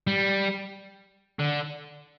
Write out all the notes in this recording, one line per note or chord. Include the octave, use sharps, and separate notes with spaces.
G3
D3